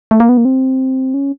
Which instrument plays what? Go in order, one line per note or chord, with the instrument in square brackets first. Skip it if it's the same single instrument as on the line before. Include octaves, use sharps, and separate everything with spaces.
[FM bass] A3
A#3
B3
A#3
C4
C#4